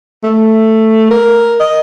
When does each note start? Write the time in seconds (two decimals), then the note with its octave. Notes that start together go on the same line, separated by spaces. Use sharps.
0.23 A3
1.11 A#4
1.60 D#5